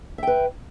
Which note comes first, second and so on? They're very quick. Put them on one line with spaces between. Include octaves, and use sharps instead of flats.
E5 G5 B4